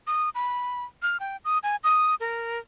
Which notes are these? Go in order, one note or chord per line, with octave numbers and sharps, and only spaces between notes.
D#6
B5
F6
G5
D#6
G#5
D#6
A#4